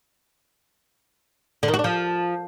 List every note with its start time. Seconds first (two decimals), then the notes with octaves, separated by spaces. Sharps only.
1.63 D3
1.68 D#3
1.74 F#4
1.79 D4
1.84 F3